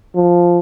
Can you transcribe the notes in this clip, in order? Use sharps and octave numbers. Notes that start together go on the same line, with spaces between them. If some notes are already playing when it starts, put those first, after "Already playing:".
F3